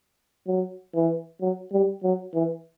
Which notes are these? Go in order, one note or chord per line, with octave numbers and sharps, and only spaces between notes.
F#3
E3
F#3
G3
F#3
E3